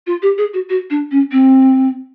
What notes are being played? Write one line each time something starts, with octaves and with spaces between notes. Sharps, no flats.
F4
G4
G#4
F#4
F#4
D4
C#4
C4